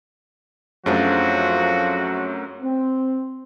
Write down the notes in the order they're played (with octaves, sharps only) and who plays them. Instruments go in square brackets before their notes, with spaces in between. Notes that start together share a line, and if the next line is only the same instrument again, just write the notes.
[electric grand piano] F#2 F#3 A3 [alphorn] F3 [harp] C4 D4 G#4 [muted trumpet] F#4
[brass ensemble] C4